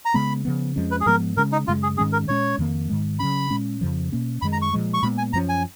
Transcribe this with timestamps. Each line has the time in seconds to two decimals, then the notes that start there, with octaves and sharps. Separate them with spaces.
0.05 A#5
0.14 C#3 G#3 B3 B5
0.45 C#3 F3 B3
0.76 F2 F3 G#3 C#4
0.91 B4
1.01 G#4
1.06 G#2 F3 G#3 B3 A#4
1.37 C#3 G#3 C#4 A#4
1.52 D#4
1.67 F#2 C#3 G#3 F4
1.83 G#4
1.97 G#2 D#3 G#3 C#4 G#4
2.13 A#4
2.28 A#2 G#3 C#4 C#5
2.59 F2 D#3 A#3
2.89 G#2 D#3 G#3
3.19 C#3 F#3 C#4 B5
3.50 A#2 G#3 C#4
3.81 F2 C#3 F3
4.12 B2 A#3 C#4
4.42 F#2 D#3 G#3 B5
4.52 A#5
4.62 C#6
4.73 A#2 F3 G#3
4.94 C#6
5.03 A#2 G#3 B3 B5
5.18 G#5
5.33 F#2 F3 A#3 C#4 A#5
5.49 G#5